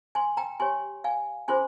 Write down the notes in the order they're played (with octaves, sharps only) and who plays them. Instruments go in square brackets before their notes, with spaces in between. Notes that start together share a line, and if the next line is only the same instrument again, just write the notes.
[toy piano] G#5 C6
G5 A#5
G4 C#5 G#5 C6
F5 G#5
C#4 F4 G#4 C5 G#5 C6